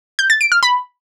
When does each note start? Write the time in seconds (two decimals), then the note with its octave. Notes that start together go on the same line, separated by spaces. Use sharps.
0.19 G6
0.30 A6
0.41 D7
0.52 F6
0.63 B5